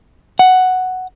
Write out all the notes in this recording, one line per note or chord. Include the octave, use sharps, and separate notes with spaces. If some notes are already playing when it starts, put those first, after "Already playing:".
F#5